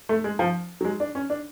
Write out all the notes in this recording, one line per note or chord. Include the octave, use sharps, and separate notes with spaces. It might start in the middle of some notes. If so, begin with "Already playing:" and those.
A3
G#3
F3
F#3
G#3
D4
C#4
D4